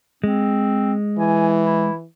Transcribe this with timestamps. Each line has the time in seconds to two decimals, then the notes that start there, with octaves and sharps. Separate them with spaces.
0.24 G#3 C4
1.18 E3 G#5
1.65 E4